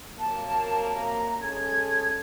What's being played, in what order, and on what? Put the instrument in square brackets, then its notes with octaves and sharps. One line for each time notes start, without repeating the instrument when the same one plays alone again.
[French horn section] C3 F#3 A#3 [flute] A5
[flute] A#5
[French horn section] G#3 C#4 A4 [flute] G#6